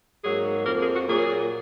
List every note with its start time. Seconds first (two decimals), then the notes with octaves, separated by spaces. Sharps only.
0.24 G#2 F#3 A#3 G#4
0.66 F2 F3 A#3 A#4
0.79 G#4
0.93 F#4
1.07 A#2 F#3 A#3 G#4